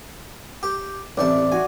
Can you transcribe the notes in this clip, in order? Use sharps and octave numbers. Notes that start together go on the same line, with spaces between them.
G4
A1 C3 D5 A5
F#4 G#5